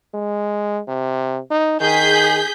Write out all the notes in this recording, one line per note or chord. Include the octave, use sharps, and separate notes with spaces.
G#3
C3
D#4
D#3 G#4 G6 B6